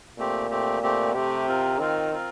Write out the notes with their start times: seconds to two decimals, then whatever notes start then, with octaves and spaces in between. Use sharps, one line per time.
0.18 A#2 A3 C4 G4
0.50 A3 C4 G4
0.83 A3 C4 G4
1.14 C3 A3 C4 G4
1.47 C4 F4 A#4
1.79 D#3 C4 F4 A#4
2.11 C4 F4 A#4